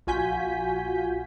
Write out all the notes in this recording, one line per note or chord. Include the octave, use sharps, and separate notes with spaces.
A#1 F4 F#4 G#5 G6 B6